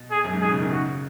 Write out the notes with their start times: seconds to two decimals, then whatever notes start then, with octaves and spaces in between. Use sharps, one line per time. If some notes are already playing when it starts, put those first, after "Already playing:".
Already playing: B2
0.11 G#4
0.24 F#2
0.33 G#2
0.41 B2 G#4
0.52 C#3
0.61 D#3
0.72 C#3 F#4